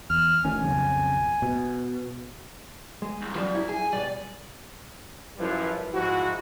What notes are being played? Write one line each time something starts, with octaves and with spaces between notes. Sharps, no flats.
E2 F6
D2 D#3 C#4 G#5
B1 F2 C#3
B2
G#3
C2
F#2 F3 G3
E4
G#4 G#5
B1 G3 D5
F#2 F3 G3 E4 B4
G#2 F3 E4 F#4